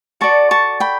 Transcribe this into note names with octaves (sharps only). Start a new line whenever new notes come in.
F#4 A4 D5 A5 C#6
A5 C#6
G5 B5